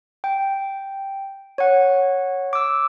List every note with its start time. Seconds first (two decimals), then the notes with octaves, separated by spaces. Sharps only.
0.24 G5
1.58 C#5 F#5
2.53 D6 E6